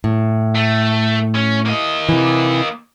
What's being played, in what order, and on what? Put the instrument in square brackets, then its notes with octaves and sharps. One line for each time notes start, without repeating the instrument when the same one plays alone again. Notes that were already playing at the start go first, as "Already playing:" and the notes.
[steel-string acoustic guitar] A2
[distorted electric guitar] A3
C#4
A#3 D#5
[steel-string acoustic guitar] C3 E3